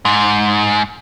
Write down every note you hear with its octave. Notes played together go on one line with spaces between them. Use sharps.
G#2